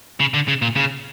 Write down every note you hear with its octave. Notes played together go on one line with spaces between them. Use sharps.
C#3
D3
C#3
A#2
C#3